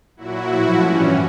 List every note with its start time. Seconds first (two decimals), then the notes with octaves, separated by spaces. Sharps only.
0.17 A#2 F#3 E4 F#4
0.47 A2 F3
0.78 G2 E3 G3 C#4